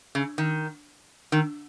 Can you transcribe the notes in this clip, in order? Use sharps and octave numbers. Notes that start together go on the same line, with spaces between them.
C#3
D#3
D#3